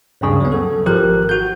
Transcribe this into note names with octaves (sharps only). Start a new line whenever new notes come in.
D2 G2 C#3 G3
F#3 B3
A4
G#1 F3 G4 A#4 F#6
F#4 G6